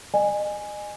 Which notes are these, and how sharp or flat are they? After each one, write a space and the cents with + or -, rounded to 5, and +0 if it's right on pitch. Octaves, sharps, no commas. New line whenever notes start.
D#5 -35 G#5 +0